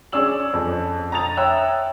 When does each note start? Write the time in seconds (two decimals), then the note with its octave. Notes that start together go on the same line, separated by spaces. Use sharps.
0.12 C#4 G#4 D5 E6 F#7
0.53 F2
1.12 A#5 D#6 A6 F7
1.37 C#5 E5 G5 E6 F#6